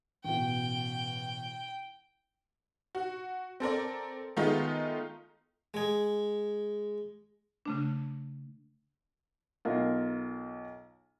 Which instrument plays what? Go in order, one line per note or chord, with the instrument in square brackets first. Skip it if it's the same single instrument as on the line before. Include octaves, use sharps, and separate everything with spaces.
[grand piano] A1 B2 [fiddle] G5
[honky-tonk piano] F#4
C4 A4 A#4 D5
D#3 G#3 A3 B3 D#4 F4
[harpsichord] G#3 G#4
[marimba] C#3 A3 D4
[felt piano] B1 F4 A#4